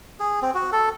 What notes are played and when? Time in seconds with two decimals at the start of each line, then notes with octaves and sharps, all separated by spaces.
0.20 G#4
0.42 C4
0.54 F#4
0.72 A4